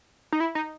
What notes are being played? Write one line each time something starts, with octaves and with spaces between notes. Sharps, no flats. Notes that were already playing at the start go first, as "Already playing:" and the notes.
D#4
E4
D#4